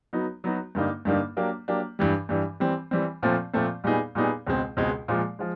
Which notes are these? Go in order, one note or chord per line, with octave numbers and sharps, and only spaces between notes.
F#3 B3 D#4 F#4
F#3 B3 D#4 F#4
G2 D3 G3 A#3 D#4
G2 D3 G3 A#3 D#4
F#3 A#3 D4 G4
F#3 A#3 D4 G4
G2 E3 G3
G2 E3 G3
E3 G3 C4
E3 G3 C4
A#2 F3 A3 C4
A#2 F3 A3 C4
A#2 G3 B3 D#4 G#4
A#2 G3 B3 D#4 G#4
C#2 B2 G#3 C4
C#2 B2 G#3 C4
A#2 F3 G#3
F3 G#3